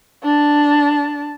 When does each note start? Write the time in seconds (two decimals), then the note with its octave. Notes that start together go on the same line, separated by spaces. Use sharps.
0.23 D4 A5